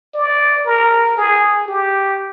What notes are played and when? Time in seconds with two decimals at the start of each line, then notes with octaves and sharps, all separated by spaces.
0.14 D5
0.66 A#4
1.17 G#4
1.68 G4